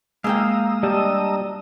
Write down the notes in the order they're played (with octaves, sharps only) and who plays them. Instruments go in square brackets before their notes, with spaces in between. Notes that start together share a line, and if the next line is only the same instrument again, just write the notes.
[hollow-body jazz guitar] G#3 A#3 G5 [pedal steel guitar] F5 [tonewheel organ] A#5 D#6 E6
[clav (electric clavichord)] G3 [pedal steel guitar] D4 D#5 A5